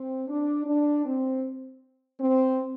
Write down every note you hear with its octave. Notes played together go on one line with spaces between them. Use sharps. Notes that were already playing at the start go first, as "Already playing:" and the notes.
Already playing: C4
D4
D4
C4
C4